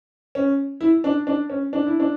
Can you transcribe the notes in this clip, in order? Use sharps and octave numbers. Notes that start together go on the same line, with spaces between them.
C#4
E4
D4
D4
C#4
D4
E4
D4